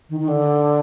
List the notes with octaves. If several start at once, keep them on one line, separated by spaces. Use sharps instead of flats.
D#3
D#3
D3